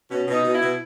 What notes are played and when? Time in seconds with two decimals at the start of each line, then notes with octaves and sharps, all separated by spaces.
0.10 B2 C#4
0.26 B2
0.32 D#4
0.43 B2
0.54 E4
0.60 B2